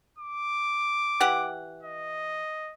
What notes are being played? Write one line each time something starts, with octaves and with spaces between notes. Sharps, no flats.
D6
E3 G4 F#5
D#5